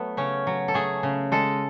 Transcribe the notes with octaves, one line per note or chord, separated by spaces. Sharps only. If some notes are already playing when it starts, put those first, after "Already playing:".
Already playing: F#3 A3 B3
C#3 C#4
F#3
A4
A3 G#4
C#3
G#3 A4